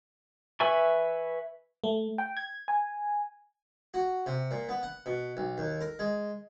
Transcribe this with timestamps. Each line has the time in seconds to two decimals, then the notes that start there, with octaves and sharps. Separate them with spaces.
0.60 B4 E5 G#5 C#6
1.84 A3
2.18 G5
2.37 G#6
2.68 G#5
3.94 F#4
4.26 C3
4.51 A#2
4.69 B3
4.83 F#5
5.06 B2
5.37 B1
5.58 D#2
5.81 A#4
5.99 G#3